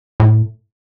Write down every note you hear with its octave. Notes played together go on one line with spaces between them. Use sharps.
A2